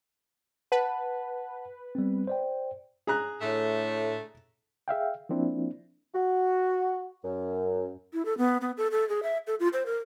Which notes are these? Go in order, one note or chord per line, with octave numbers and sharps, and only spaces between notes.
B4 F#5 A5
G3 B3 C4
C5 D5 G5
G#4 A#5 F#6
A2 D3 A3
G#4 E5 F5 G5
F3 A#3 C4 D4 E4
F#4
F#2
E4
A4
B3
B3
A4
A4
G#4
E5
A4
F4
C5
A#4